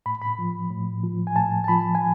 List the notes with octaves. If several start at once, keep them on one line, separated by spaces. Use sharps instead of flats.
A2 B5
B5
F3
A2
F3
G#5
A2 A5
A5
F3 B5
G#5